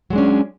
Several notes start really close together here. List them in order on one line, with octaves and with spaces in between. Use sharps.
F#3 G#3 D4 C#4